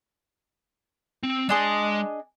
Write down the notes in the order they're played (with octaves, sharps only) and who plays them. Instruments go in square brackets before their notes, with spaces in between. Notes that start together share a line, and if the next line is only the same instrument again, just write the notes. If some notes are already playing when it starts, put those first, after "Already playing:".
[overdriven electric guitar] C4
[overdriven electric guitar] G#3 C6 [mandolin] D4 G#4 D#5